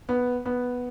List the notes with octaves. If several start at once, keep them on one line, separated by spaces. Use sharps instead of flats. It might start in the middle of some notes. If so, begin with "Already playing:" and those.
B3
B3